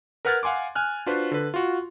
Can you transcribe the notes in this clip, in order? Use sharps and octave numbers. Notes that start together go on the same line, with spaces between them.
A#4 B4 F#5 F6 G#6 A6
F5 F#5 G#5 C6 D6
G#5 F6 F#6
D4 F4 F#4 B4 C5
D3 B4
F4 F#4